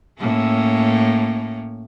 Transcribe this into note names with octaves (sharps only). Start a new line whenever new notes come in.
A2 A#3 C#4